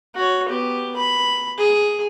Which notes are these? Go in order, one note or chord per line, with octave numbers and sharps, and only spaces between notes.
F#4 C#5
B3 G4
B5
G#4